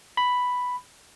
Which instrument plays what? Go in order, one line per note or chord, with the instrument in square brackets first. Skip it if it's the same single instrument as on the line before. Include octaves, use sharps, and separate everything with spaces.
[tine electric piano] B5